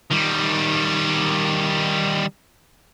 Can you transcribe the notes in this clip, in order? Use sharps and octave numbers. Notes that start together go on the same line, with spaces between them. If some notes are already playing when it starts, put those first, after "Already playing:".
D#3 G3